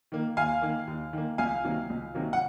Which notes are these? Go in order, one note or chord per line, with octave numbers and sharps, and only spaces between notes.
D#3 A#3
D#2 F5 G#5
D#3 A#3
D#2
D#3 A#3
C#2 F5 G#5
C3 D#3 F#3 A#3
C#2
C3 D#3 F#3 A#3
F#5